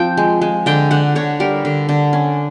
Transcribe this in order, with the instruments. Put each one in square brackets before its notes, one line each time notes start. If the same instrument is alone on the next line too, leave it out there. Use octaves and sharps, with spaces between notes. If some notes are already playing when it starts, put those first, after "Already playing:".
Already playing: [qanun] F3 C4 G5
G#3
G#3
D3 G5
D3 F#5
D3 C#5
G3 A#4
D3
D3
C#4